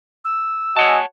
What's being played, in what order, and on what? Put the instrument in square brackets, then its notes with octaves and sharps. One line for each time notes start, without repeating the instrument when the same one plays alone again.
[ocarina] E6
[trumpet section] F#4 D#5 G#5 [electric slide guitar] C#5 F#5 A5